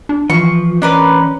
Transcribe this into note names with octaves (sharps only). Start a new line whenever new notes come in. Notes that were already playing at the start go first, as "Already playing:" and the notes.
D4
E3 F3 C#6
C#4 D4 A#4 B4